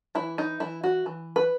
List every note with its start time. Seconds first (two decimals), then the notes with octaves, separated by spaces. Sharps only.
0.15 E3 E4
0.38 D#4
0.60 E3 E4
0.83 F#4
1.06 E3
1.36 B4